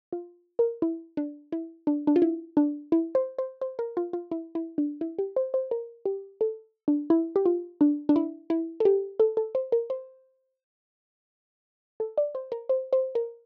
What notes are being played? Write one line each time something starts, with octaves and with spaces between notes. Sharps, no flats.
F4
A#4
E4
D4
E4
D4
D4
F4
E4
D4
E4
C5
C5
C5
A#4
F4
F4
E4
E4
D4
E4
G4
C5
C5
A#4
G4
A4
D4
E4
G4
F4
D4
D4
E4
E4
A4
G4
A4
A4
C5
A#4
C5
A4
D5
C5
A#4
C5
C5
A#4